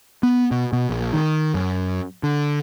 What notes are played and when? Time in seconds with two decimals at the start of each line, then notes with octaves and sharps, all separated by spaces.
0.23 B3
0.51 B2
0.73 B2
0.89 A#1
1.13 D#3
1.54 F#2
2.23 D3